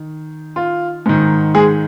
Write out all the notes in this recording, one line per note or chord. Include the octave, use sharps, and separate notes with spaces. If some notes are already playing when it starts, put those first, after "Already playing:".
Already playing: D#3
F4
G#2 D#3
G#3 G#4